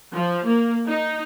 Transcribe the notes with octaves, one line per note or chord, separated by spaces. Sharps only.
F3
A#3
D#4